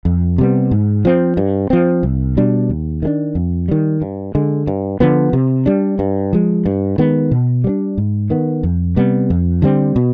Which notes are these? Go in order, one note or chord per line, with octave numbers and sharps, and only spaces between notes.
F2
C3 G3 B3
G#2
F3 C4
G2
F3 C4
C2
B2 G3 D4
D#2
D#3 G#3 D4
F2
D#3 G3
G2
D3 G#3
G2
D3 F3 B3
C3
G3 D4
G2
F3 G#3
G2
D#3 G#3 B3
B2
G3 B3 D4
G#2
D#3 B3
F2
C3 G3 B3
F2
D3 G3 C4
B2